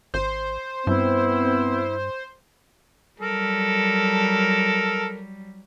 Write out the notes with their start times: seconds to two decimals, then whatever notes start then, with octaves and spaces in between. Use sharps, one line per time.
0.14 G#1 C5
0.87 G2 B3 C4 E4
3.20 F#3 G3 A4 A#4